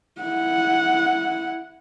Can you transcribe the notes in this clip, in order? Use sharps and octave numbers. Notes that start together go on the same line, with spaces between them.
E4 F#5